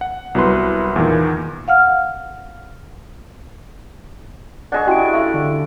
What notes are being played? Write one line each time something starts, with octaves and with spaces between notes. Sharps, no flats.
F#5
C2 F#3 B3 E4 B4 C6
E2 A#2 D#3
F5 F#5 F6
D4 G#4 D5 D#5 F#5 C#6
C#4 E4 F#4 G4 G5 D7
A3 E5 F5
D3